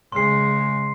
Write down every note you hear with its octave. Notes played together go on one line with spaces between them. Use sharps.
C#3 G#3 C6 C7